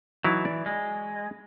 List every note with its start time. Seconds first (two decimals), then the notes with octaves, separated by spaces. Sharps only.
0.24 E3 F#3 D#4 E4
0.45 D5
0.66 G#3